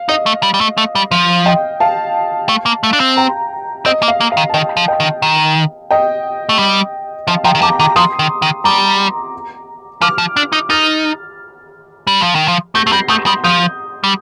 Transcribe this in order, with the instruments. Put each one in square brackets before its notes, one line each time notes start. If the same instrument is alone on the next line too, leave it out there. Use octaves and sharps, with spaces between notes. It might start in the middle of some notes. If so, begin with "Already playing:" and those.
Already playing: [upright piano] F5
[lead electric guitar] D#4 [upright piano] D#5
[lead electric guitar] A3
G3
G3
A3
A3
G3
[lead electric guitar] F3 [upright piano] F5
[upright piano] D#5 G5
F5 A5
[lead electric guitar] A3
A#3
A3
D4
C4
[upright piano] G5 A#5
[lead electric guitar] C4 [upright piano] D#5
[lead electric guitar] A#3
[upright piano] F5
[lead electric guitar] A#3
[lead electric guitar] D#3 [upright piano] F5
[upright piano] A5
[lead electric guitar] D#3 [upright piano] D#5 G5
[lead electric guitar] F3
[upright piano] D#5 G5
[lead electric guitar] D#3
D#3
[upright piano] D#5 G5
[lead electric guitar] A3
G3
[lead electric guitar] F3 [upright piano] F5 A5
[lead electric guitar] F3 [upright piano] G5 A#5
[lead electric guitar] D#3
[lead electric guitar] F3 [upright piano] A#5 D6
[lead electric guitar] D#3 [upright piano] A#5 D6
[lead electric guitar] F3 [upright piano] C6 D#6
[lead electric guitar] D#3
D#3
[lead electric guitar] G3 [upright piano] A#5 D6
[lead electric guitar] F3 [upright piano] D6 F6
[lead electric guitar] F3
D4
D#4
[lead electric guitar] D#4 [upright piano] F6 A6
[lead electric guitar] G3
F3
D#3
F3
[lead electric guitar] A3 [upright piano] G6 A#6
[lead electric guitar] A3 [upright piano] C7
[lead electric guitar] G3 [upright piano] G6 A#6
[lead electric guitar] A3 [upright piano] D#6 G6
[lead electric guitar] G3 [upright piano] C6 D#6
[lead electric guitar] F3 [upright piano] D#6 G6
[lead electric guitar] G3